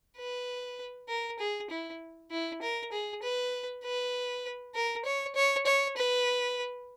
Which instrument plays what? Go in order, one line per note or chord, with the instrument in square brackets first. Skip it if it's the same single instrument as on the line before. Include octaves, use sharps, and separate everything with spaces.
[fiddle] B4
A#4
G#4
E4
E4
A#4
G#4
B4
B4
A#4
C#5
C#5
C#5
B4